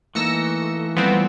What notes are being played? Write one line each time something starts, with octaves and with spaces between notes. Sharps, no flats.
E3 A3 A#3 D#4 A4 E6 A#6 C#7
F3 G3 B3 C4 G5 C6